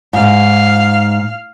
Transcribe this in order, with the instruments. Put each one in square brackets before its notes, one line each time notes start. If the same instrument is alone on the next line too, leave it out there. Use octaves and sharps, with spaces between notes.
[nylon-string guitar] G#2 [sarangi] F5